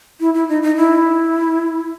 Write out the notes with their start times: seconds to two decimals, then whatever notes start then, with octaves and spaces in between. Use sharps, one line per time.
0.20 E4
0.34 E4
0.49 D#4
0.63 D#4
0.76 E4